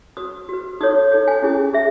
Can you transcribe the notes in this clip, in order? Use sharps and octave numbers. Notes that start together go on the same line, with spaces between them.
F#4 B4 D#6
F#4 B4
D#4 A4 C#5 D#6
D#4 A4 C#5
G#5
C#4 E4 G#4
G#4 E5